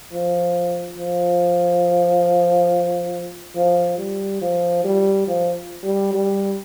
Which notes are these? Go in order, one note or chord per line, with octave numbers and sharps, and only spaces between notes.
F3
F3
F3
G3
F3
G3
F3
G3
G3